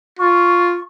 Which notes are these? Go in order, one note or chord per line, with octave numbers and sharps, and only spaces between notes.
F4 C#6